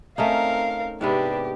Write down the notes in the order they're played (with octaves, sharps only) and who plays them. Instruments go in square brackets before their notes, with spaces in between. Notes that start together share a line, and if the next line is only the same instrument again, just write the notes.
[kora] A3 C#4 D#4 [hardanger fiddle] C4 A#4 [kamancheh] F5
[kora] G#2 C3 B3 [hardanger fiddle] D4 B4 [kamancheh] G4